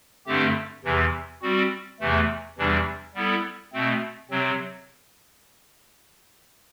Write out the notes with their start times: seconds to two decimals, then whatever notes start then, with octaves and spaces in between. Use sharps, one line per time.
0.26 G2 D3 A3 C4 G4
0.84 E2 C3 E3
1.42 G3 C4 F#4
2.00 E2 C3 E3 A3
2.58 E2 C3 E3 G3 D4
3.15 G3 B3 E4 A4
3.72 B2 A3 C4
4.30 C3 F#3 C4